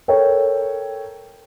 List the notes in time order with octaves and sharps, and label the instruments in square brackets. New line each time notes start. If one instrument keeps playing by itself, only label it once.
[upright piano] A4 A#4 C#5 G5